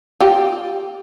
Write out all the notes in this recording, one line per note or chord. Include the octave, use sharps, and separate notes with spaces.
F4 G4